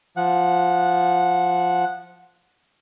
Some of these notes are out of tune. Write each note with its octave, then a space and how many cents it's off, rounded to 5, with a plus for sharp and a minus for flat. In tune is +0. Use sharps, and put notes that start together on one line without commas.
F3 +0 F#5 -15